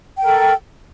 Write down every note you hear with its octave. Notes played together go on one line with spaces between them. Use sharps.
A4 A#4 G5